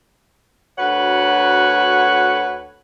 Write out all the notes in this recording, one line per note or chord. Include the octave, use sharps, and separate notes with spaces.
D2 F#4 B4 C#5 F#5